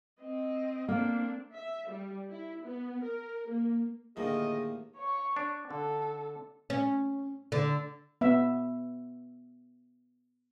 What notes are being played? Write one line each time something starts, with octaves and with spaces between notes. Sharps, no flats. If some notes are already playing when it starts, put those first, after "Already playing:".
C4 D#5
A#3 C4 D4
E5
G3
E4
B3
A#4
A#3
D#2 A2 D3 D#3 F3 A#3 G#4 D#5
C#5 C#6
D4
D3 A4
C#4
D3
B3 E5